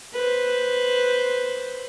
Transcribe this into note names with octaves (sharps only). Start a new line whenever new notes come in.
B4 C5